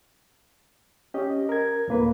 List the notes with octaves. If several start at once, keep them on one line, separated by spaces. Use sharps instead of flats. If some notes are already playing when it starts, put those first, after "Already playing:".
C#4 G4 D#5
A#4 G#6
D2 A2 A#3 B4